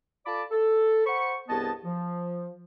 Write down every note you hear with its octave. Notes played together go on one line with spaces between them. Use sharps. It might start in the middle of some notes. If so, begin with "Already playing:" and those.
F4 A4 D5 A5 B5 D6
A4
C5 F#5 B5 C#6
C2 G2 B3 G#4 D#5 A5
F3